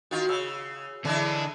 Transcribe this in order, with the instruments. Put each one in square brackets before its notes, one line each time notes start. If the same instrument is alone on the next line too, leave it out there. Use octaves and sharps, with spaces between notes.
[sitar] D#3 F4 [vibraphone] F#4
[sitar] C#3 [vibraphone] E6
[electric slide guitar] D3 D4 [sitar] E3 G#3 E4